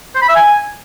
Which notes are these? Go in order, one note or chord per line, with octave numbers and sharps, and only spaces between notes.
C5
B5
E5
G#5